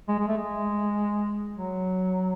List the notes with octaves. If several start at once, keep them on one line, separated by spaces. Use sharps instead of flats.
G#3
G#3
A3
G#3
F#3